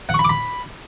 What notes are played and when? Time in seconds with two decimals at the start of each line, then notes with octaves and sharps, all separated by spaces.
0.09 F#5
0.14 C#6
0.19 B5
0.24 D6
0.29 B5